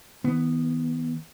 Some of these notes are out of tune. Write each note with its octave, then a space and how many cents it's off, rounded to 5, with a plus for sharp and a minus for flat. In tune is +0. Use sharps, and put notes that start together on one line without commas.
D#3 +40 B3 +0